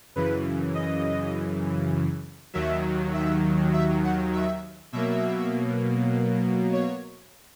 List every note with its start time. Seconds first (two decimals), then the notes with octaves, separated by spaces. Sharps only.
0.16 F#2 C#3 E3 B4
0.75 D#5
2.54 D#2 D#3 F#3 E5
3.14 E5
3.73 E5
4.04 F#5
4.33 E5
4.93 B2 F#3 A#3 E5
6.73 C#5